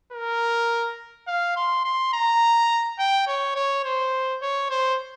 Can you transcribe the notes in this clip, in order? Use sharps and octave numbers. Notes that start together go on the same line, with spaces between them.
A#4
F5
C6
C6
A#5
G5
C#5
C#5
C5
C#5
C5